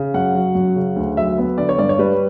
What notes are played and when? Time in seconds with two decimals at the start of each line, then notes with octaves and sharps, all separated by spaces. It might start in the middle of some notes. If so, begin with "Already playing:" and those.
Already playing: C#3
0.14 F#2 F#5
0.35 F#3
0.55 F#2
0.75 C#3
0.96 D2
1.17 F#3 E5
1.38 B3
1.58 D3 D5
1.69 C#5
1.79 G2 D5
1.89 C#5
1.99 G3 B4